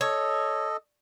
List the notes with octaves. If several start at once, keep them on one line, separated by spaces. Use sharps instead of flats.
A4 C#5 D#5